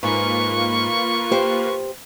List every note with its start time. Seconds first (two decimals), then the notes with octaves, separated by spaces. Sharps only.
0.03 G#2 A#3 F4 B4 C#6
1.31 G4 C5